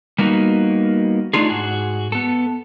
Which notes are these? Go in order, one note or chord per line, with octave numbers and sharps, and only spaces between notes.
G3 A#3 B3 D#4 F#4
A3 D4 D#4 F4 G#4
G#2 F#4 G#4
B3 A4